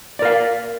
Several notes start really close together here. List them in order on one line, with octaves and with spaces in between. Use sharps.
D5 A#4 F5